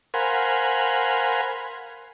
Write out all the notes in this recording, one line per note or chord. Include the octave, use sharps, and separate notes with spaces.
A#4 C5 F5 F#5 G#5 B5